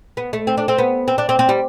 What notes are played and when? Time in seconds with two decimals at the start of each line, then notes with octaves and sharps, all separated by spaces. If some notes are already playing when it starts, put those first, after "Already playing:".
0.17 B3
0.33 A3
0.47 C4
0.58 D4
0.68 C4
0.78 B3
1.08 C4
1.18 D4
1.29 C4
1.39 C4
1.49 G3